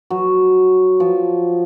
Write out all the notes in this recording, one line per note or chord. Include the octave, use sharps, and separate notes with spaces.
F#3
F3